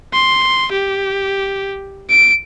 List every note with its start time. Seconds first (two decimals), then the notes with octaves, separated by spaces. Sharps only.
0.13 C6
0.72 G4
2.10 D7